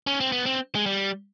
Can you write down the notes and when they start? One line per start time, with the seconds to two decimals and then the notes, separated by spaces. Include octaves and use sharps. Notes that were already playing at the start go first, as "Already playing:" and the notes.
0.07 C#4
0.20 C4
0.32 B3
0.46 C4
0.75 G#3
0.86 G3